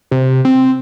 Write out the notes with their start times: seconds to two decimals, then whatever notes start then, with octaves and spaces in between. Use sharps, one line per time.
0.11 C3
0.45 C4